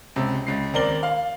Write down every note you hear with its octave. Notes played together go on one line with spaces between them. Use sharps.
C#2 C3
C#2 C7
D#2 C4 A#4 D5 F#7 G7
F5